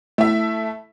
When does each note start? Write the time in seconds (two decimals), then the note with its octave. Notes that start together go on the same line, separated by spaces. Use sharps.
0.18 A3 E4 E5